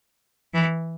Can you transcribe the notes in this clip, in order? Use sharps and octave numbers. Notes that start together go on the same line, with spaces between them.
E3